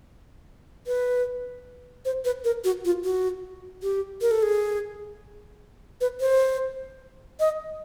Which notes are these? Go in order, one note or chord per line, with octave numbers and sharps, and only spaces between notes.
B4
C5
B4
A#4
F#4
F4
F#4
G4
A#4
A4
G#4
B4
C5
D#5